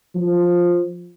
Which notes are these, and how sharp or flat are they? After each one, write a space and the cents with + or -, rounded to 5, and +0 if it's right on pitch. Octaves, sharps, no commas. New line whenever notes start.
F3 +5